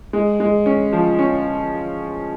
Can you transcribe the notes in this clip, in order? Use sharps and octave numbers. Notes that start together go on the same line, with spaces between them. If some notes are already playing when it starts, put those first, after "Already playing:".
G#3
G#3
C#4
F3
C#4